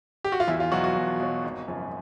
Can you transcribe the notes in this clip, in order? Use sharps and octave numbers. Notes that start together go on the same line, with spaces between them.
G4
F#4
F4
E2 E4
F4
B2 F#3 F#4
F#4
E2
B2 F#3
G#1
F#2 C#3 F3